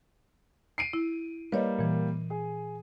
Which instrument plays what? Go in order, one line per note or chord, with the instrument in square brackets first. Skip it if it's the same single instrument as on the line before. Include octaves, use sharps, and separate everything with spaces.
[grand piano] C7 D7 D#7
[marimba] E4
[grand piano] G3 A#3 [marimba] B4 C#5 D#5
[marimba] A#2 E3
[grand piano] G#4